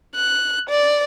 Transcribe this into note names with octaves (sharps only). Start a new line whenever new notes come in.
F#6
D5